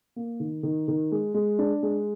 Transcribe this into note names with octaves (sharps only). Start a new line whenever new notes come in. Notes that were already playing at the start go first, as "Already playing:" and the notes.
A#3
D#3
D#3
D#3
G#3
G#3
D4
G#3